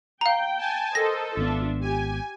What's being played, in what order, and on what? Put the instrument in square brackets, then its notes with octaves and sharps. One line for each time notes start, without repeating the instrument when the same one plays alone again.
[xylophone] F5 A#5 [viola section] G5
[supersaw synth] G#5 A5
[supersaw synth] A4 [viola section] A#4 C5 D#5 [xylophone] A#6
[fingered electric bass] G#1 B3 [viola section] D4 F4 E5
[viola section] G4 [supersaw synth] G#5